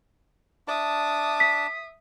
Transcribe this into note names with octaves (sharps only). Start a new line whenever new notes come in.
D4 E5 A5 D6 D#6
B6